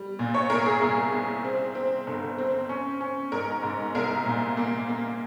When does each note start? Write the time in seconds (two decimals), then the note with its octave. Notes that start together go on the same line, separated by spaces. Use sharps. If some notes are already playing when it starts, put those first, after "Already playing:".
Already playing: G3
0.19 A#2
0.34 C#5
0.50 C2 A#4
0.66 G#4
0.82 C2 G#4
1.13 C2
1.44 C4
1.75 C4
2.07 G1
2.38 C4
2.69 C#4
3.01 C#4
3.32 G#2 A#4
3.63 G#2
3.95 C2 A#4
4.26 A#2
4.57 A#3
4.89 A#3